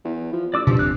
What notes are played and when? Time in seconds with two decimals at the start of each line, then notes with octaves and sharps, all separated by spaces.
0.05 E2
0.33 F3
0.54 A1 D5 D6 E6
0.67 G2 A#2 F3
0.79 D#1 C4 F#6